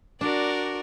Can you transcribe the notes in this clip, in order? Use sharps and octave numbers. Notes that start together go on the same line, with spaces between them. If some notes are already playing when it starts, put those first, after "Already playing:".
D4 F#4 A#4 D5